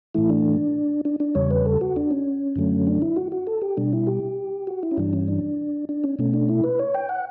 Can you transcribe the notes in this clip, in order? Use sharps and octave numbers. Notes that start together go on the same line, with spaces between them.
A2 E3 A3 E4
D4
D4
D4
E2 C#3 G3 C#5
B4
A4
F#4
D4
C#4
F#2 D3 F#3 A3
D4
E4
F#4
F#4
A4
G4
B2 G3 D4
E4
G4
F#4
E4
C#4
G2 E3 G3 D4
C#4
D4
D4
C#4
B2 A3 C#4
D4
E4
B4
C#5
G5
F#5